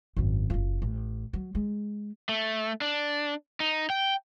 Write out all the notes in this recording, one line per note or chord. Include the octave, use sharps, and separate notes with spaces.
G#1 F#2
F#1 F4
A1
F#3
G#3
A3
D4
D#4
G5